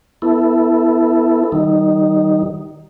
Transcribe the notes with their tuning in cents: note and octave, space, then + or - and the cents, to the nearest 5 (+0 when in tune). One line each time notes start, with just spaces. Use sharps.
B3 +0 E4 +0 A4 +0
D#3 +0 G3 -35 D#4 +0